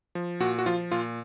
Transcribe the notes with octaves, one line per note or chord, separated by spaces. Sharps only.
F3
A#2 F#4
F#4
F3 F4
A#2 F4